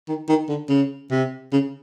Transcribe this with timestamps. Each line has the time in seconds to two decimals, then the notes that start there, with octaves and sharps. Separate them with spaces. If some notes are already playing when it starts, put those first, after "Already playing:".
0.08 D#3
0.29 D#3
0.49 D3
0.69 C#3
1.11 C3
1.52 C#3